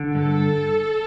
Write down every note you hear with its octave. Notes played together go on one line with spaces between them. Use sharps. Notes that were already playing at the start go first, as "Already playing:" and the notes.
Already playing: D3
G2 A4